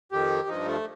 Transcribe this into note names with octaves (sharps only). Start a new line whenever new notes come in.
F2 D#3 G4
G2 F3 D#4
A3